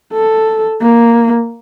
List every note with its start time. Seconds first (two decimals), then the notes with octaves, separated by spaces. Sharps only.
0.14 A4
0.82 A#3